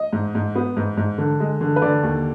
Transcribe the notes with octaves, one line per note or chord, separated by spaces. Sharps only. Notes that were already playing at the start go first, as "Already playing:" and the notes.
Already playing: D#5
G#2
G#2
B3
G#2
G#2
D3
G#3
D3
B4
D3 D5
D#2